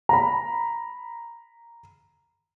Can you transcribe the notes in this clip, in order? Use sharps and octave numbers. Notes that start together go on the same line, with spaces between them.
A#5 B5